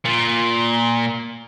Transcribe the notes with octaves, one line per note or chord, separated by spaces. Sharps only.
A#2